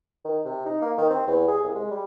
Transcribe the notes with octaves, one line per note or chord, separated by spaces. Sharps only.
D#3
C3
D#4
A#3
D#3
C4
E2
G#4
C2
G#3
G3